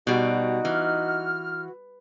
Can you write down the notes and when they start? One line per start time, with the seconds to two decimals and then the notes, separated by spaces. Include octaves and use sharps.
0.07 B2 G3 D#4 F#4
0.65 E3 F6